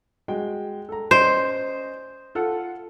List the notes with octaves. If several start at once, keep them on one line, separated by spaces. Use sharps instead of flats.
G#3 F#4 G5
A4 A#5
C#4 C5 D5 D#5
F4 A4 F#5